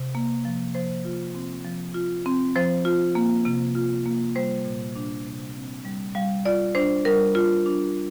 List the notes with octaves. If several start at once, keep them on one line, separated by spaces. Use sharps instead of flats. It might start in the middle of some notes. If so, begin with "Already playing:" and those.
Already playing: C3
A#3
F3
F3 C5
F4
C4
F3
F4
C4
F3 C5
F4
A#3
C3
F4
A#3
G3 C5
A#2
D4
C3
C4
G3
G3 F5
F4 D5
D4 C5
G3 A#4
F4
D4